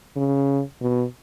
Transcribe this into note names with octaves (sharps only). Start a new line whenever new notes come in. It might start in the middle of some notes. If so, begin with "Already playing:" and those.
C#3
B2